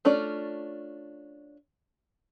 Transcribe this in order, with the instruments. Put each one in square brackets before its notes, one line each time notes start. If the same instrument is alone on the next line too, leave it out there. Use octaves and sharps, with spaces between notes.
[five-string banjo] A3 C#4 D4 F4 D5